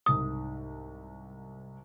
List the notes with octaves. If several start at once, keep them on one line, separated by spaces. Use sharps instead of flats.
C2 G#2 D#6